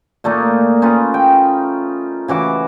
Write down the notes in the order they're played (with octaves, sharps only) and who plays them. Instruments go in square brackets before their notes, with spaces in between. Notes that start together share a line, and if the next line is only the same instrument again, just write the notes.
[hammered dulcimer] A#2 A3 A#3 D#4
C#4 D#4 F4 B4
G5
C#3 E3 F#4 D6